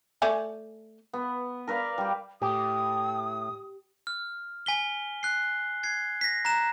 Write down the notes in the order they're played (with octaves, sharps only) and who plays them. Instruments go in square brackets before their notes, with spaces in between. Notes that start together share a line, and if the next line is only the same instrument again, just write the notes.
[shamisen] A3 D5 G#5
[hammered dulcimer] B3
A#4 B4 D5 F5
G3 G4
[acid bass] A2 [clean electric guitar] G4 [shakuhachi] D#6
[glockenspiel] F6
G#5 B6 G7
F#6 C7
G#6 C7
A#6 B6
A#5 F#6 E7